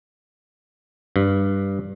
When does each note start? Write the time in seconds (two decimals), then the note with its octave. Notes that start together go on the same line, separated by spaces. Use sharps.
1.16 G2